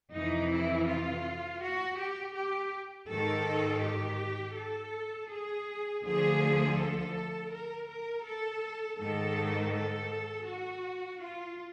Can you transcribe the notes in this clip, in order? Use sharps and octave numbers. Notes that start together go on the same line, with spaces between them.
F2 C3 E3 D#4
E4
F4
F#4
G4
G4
G#2 D#3 A4
G4
A4
G#4
D2 D3 F3 G#4
A4
A#4
A#4
A4
G#2 D#3 A4
A4
F#4
F4